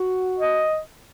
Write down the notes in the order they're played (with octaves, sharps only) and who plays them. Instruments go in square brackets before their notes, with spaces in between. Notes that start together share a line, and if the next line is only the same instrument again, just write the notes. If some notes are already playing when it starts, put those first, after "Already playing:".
Already playing: [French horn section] F#4
[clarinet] D#5